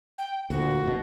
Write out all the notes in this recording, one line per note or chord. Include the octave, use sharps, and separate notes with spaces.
G5
D2 A#2 F#4
F1 G#2 B2